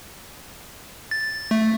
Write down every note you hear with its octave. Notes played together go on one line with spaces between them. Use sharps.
A6
A3